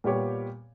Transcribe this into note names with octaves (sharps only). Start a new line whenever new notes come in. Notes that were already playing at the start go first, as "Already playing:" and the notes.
A#2 G3 B3 G4 C#5